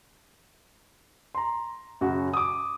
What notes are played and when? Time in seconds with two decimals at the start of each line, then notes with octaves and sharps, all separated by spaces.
1.35 A#5 C6
2.01 F#2 C#3 F#4
2.33 D6 D#6